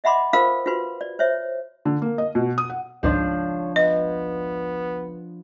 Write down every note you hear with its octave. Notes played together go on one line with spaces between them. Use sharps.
D#5 E5 F#5 B5 C6 D6
F4 A#4 C5 F5 B5 D#6
F4 F#4 B4 C6
D5
C5 C#5 E5
D3
A#3
D#5
B2
D#6
F#5
G#1 C#2 G#2 F3 D4 F4 C#5
B3 D#5